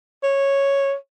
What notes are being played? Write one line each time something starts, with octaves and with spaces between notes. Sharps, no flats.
C#5